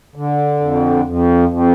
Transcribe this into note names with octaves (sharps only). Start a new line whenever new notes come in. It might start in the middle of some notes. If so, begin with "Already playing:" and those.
D3
F2
F2
F2